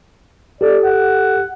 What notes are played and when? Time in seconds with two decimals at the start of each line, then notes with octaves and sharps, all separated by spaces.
0.61 G4 A4 D5
0.84 F#5